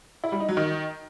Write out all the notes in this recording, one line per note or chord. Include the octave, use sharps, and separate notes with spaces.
E4
G3
D#4
F#3
D#3